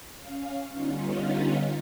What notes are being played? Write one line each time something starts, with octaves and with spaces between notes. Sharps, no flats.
C#4 F5
D3 G3 B3 C#4 D#4 F4